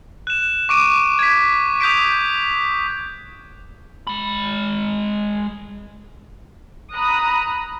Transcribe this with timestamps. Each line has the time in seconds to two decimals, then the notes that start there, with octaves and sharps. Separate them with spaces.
0.27 F#6 E7
0.69 C#6 D6 D7 D#7
1.19 G#6 B6
1.80 D#6 G6 B6 D7
4.07 G#3 B5
6.95 A#5 B5 D#6 F#6